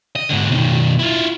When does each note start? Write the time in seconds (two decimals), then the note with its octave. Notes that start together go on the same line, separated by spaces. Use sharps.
0.15 D#5
0.29 G#2 D3
0.51 B2 D#3
0.99 E4 F4